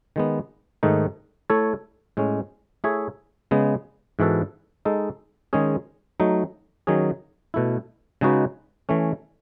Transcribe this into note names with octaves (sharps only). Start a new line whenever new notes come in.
D#3 G#3 B3
G#2 D#3 A3 D#4
A3 E4 A4 C#5
A2 G#3 C#4
A3 E4 G#4 C#5 E5
C#3 G#3 B3
G#2 E3 B3 F#4 A4
G#3 D#4 A4
D#3 G#3 C#4 G#4
F#3 A3 D#4
D#3 F#3 C#4 G#4
B2 A3 E4
C#3 G#3 D#4 F#4 B4
E3 A3 C#4